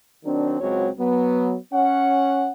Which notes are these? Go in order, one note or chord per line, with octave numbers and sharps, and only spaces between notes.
D#3 F#3 C4 D4
C#2 F#3 G#3 C4 F#4 C#5
F#3 B3
C#4 F#5